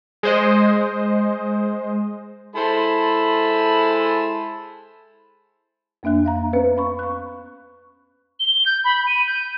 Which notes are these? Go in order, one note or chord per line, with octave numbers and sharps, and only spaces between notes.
G#3 C5 D#5
G#3 E4 A4 C5 A5 B5
F2 A#3 D4 E5 F#6
E5 F5 A#5
B3 C#4 B4 C5
F5 B5 C#6
C#6 F#6
G7
G6
B5
D#7
G6